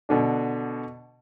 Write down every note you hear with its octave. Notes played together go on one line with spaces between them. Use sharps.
B2 D3 D4